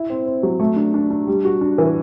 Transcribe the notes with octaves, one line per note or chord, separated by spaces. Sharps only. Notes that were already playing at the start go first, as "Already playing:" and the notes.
Already playing: E4
C4
C4
F#3
A3
D4
D4
D4
G3
F#4
D4
E3